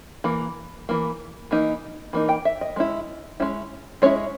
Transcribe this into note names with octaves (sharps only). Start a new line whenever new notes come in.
E3 A#3
E3 A#3
E3 A#3 D#4
E3 A#3 D#4
G5
E5
D#5
G#3 C#4 E4
G#3 C#4 E4
G#3 C#4 E4 C#5